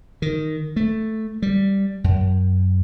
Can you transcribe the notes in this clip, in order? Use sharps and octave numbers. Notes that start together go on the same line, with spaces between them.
D#3
A3
G3
F#2